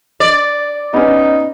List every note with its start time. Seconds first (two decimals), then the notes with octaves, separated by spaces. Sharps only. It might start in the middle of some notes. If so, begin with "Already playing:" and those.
0.20 D5
0.94 B3 C#4 D#4